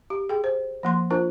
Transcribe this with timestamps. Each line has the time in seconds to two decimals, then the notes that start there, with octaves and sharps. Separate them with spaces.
0.10 G4
0.29 G#4 G5
0.44 C5
0.83 F3 A#3 C6
1.10 D4 F4 A#4 C5